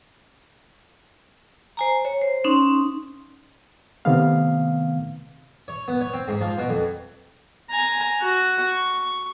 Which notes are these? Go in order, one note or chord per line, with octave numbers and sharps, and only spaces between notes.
C5 G#5 A#5
C#5
C5
C#4 D#4 C6
C3 D#3 A3 B3 C4 F5
C#5
B3
C#5
C4
G#2
F3
B2
F2
G#5 A#5
F#4
C#6